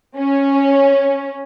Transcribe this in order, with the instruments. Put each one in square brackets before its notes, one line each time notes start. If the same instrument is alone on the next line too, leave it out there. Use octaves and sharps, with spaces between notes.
[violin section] C#4